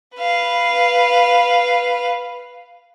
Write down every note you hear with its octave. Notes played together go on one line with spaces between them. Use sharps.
B4 F5